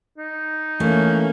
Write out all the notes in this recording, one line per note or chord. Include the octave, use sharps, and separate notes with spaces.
D#4
E3 A3 A#3 C#4